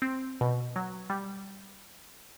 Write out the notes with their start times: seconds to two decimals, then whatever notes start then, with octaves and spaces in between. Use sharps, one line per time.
0.02 C4
0.41 B2
0.76 F#3
1.10 G3